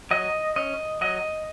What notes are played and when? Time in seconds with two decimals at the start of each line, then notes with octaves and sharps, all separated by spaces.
0.11 F#3 D#5
0.56 C#4 D#5
1.01 F#3 D#5